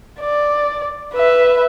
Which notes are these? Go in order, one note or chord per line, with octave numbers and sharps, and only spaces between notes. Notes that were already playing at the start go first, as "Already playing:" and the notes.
D5
B4 E5